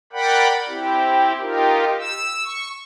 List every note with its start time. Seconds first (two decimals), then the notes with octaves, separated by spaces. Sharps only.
0.13 A#4 D5 F#5 G5 B5
0.69 C4 E4 G4
1.40 D#4 F4 G4 A#4
2.00 E6
2.45 C#6